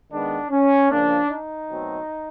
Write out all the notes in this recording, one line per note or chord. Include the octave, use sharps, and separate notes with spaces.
D#3 G#3 B3 D4
C#4
C#3 F3 A#3 D4
D#4
B2 F#3 A3 C4